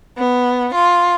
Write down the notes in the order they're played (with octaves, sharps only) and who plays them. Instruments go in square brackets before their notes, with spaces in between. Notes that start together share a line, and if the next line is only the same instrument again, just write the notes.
[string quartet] B3
F4